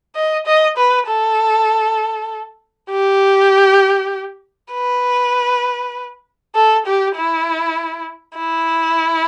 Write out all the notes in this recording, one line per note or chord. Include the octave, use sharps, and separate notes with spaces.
D#5
D#5
B4
A4
G4
B4
A4
G4
E4
E4